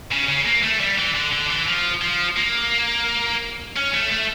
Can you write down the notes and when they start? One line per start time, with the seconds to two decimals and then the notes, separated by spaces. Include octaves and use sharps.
0.12 C#3
0.29 C#3
0.46 A#3
0.63 A3
0.81 G3
0.98 E3
1.15 D3
1.33 D3
1.50 E3
1.67 F3
2.02 F3
2.37 A#3
3.76 C#4
3.94 A3
4.11 A3